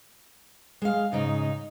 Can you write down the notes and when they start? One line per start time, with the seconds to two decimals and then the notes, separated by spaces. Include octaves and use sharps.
0.82 G#3 F5
1.13 G#2 C#3 D#4